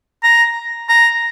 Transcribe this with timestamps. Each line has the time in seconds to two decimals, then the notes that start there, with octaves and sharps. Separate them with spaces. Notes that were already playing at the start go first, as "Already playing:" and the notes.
0.24 A#5
0.89 A#5